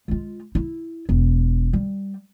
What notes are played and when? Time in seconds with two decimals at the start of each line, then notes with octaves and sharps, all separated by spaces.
0.08 G#3 F4
0.55 E4
1.09 E1
1.73 G3